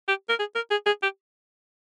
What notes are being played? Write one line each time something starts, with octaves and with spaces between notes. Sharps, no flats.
G4
A#4
G#4
A#4
G#4
G#4
G4